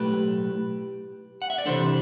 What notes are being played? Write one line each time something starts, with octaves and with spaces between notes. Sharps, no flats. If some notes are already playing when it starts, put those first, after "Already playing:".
Already playing: B1 A2 F#3 A3 G4 B4
F#5
E5
D5
C3 E3 G3 D4 A4 C5